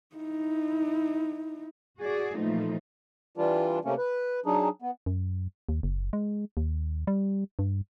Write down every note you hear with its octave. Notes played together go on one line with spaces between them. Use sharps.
D#4 E4
F#4 G#4 D5
A#2 E3 F3 A3 D#4
E3 G3 D4 F4
C3 A3 A#3 C#4
B4
F#3 D4 D#4 G#4
B3
F#2
D#2
F#1
G#3
D#2
G3
G2